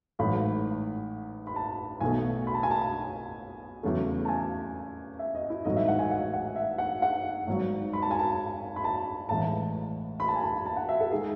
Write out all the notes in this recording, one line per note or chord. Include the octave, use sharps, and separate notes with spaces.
A1 G#2 F#3 A3 B5
B5
A5
B1 B2 A3 G#5
B5
A5
G#5
A5
E2 C#3 F#3 A3
A5
G#5
E5
D#5
E4
A1 G#2 D#3 F#3 A3 D#5
E5
F#5
G#5
F#5
F#5
E5
F#5
F#5
G#1 G#2 F#3
B5
A5
G#5
A5
B5
A5
A1 A2 E3 G#3 A5
B5
A5
G#5
A5
A5
F#5
E5
A4
D#3 G#3 G#4